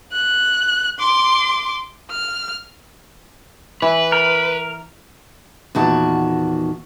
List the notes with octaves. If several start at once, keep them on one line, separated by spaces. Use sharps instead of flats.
F#6
C6 D6
F6
E3 B4
A#4
E2 A#2 D#3 F#4 A5